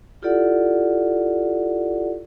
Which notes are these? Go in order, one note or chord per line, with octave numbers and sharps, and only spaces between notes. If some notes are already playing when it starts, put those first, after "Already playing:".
E4 F4 G4 A4 D5 F#5